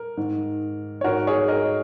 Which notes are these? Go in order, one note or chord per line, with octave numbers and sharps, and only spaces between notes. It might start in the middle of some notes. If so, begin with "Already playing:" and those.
Already playing: A#4
G#2 D#3
C#5
G#2 D#3 F#4 A#4
G#4 C#5
A#4 D#5